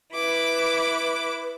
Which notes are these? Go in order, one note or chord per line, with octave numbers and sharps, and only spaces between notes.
E4 B4 D6